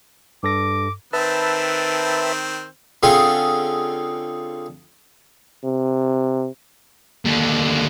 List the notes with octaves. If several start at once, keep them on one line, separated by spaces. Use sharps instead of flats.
G2 A4 D6 A#6
D#3 C4 B4 E5 A5
D3 C4 C#4 F4 G#4
C3
D#2 D3